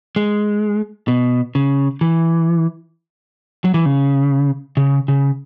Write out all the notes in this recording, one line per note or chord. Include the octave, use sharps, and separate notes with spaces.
G#3
B2
C#3
E3
F#3
E3
C#3
C#3
C#3